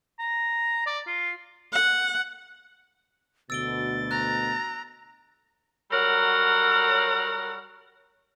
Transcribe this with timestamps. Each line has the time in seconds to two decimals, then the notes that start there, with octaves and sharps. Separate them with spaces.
0.19 A#5
0.87 D5
1.07 F4
1.73 F#5
3.50 D2 B2 E6 A6 D7 G7
4.11 A#5 F#6
5.91 F#3 G3 A4 A#4 C#5 F#5